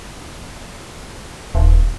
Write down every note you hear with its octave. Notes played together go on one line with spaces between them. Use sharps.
D#1